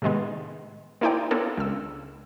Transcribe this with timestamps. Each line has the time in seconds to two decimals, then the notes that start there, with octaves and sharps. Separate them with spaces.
0.02 A2 C3 D#3 G#3 B3
1.01 A#3 D#4 E4 C5 D5 G5
1.31 B3 D4 F4 A4 A#4 C#5
1.57 C#2 E6